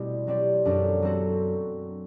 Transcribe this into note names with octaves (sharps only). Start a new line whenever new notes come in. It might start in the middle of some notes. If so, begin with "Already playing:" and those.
Already playing: B2 G3 A3 C4 E4 G4
F#3 C4 G4 D5
F#2 F#3 B3 D4 A4
F#3 C4 F#4 A4